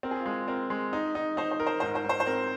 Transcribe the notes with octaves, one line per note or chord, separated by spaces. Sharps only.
C4 A#4
G#4
F4
G#3 G#4
C4 A#4
G#3
D#4
D#4
D#4 C5
C5
A#4
C5
G#2 C5
C5
G#2
C5
C5
C4 A#4